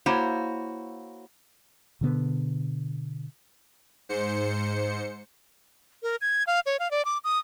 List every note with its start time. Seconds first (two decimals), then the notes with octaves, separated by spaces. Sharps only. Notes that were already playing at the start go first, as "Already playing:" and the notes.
0.06 A#3 E4 F#4 C5 C#5
2.01 B2 D3 B3
4.09 G#2 C5 C#7
6.03 A#4
6.21 G#6
6.47 F5
6.66 C#5
6.79 F5
6.91 D5
7.05 D6
7.24 D#6